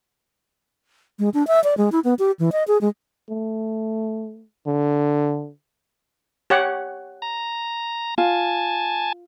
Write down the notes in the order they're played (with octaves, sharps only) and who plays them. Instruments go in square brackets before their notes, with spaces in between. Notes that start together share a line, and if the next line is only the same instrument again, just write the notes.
[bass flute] G#3
D4
E5
D5
G#3
E4
B3
G4
E3
D#5
G#4
G#3
[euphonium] A3
D3
[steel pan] G4 C#5 F#5
[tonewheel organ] A#5
[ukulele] F4 [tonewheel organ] G#5 A5